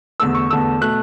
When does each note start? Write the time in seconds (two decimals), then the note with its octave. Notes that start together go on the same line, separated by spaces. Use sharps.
0.20 E2 D3 A3 E6
0.35 C#6
0.50 E2 D3 A3 E6
0.81 B2 A3 F#6